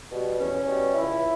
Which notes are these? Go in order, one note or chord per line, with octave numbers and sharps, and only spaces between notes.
B2 G3
E2 C#4
B2 G3
C#2 E4